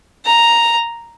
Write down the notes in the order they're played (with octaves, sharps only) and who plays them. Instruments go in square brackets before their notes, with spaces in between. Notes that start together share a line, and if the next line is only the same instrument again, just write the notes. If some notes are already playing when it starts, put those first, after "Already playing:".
[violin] A#5